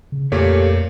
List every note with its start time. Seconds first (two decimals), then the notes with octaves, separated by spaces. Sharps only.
0.12 C#3
0.32 F2 A#2 A3 A#3 G4 A4 C#5